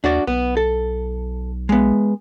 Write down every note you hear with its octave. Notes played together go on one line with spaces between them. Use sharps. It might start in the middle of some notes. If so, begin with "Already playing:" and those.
D#2 D4 F#4 D5
B1 B3
A4
G#3 B3